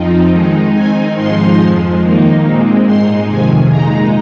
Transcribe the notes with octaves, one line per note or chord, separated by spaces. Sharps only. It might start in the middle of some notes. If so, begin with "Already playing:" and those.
Already playing: F2 F3 C4 D#4
D#3 G#3 D#4
D#3 C4 D#4 G#5
G#2 F3 G#3 D#4 C6
F2 F3 G#3
D#3 A#3 D#4
A#2 G#3 C4
G#2 G#3 D#4 C6
F2 C3 D#3 G#5
A#2 G#3 D#4 A#5